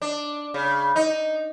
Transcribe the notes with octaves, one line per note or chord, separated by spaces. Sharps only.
D4
C#3
D#4